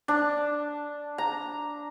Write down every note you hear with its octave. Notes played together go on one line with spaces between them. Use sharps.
D4
A#5